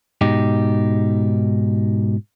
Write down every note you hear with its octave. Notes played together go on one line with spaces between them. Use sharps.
G#2 B2 D#4 G4